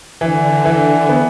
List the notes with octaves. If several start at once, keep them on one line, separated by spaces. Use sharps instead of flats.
D3 E3
E3
B3